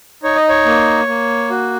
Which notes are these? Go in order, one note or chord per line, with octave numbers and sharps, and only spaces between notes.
D#4 C#5
D#5
C#5
A#3
A#3
F#4